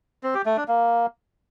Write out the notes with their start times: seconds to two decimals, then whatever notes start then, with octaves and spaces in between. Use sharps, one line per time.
0.23 C4
0.35 G4
0.46 A3
0.57 D4
0.68 A#3